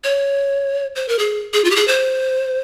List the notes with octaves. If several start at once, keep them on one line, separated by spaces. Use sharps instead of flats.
C#5
C5
A#4
G#4
G#4
F4
G4
G#4
C5